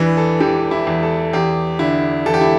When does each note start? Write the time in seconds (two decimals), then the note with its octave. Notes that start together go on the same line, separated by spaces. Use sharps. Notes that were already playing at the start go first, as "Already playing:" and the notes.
Already playing: E2 E3 D4 B4
0.17 A4
0.40 E3 G4
0.71 E4
0.87 E2
1.03 A4
1.33 E2 G4
1.79 D3 E4
2.26 E2 A4
2.34 G4
2.41 E4